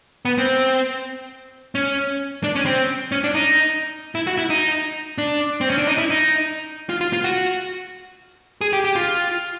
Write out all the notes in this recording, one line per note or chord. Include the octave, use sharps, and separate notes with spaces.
B3
C4
C#4
D4
C#4
C4
C#4
D4
D#4
E4
F#4
E4
D#4
D4
C4
C#4
D4
D#4
E4
D#4
F4
F4
F4
F#4
G#4
G4
G4
F4